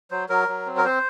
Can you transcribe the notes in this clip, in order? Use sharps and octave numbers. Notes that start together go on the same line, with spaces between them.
F#3 C5
F#3 A#4
F#3
C4
A#4
C4 C5